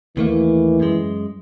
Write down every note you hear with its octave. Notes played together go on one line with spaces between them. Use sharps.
D#2 E3 A3 A#3
F#2 G#3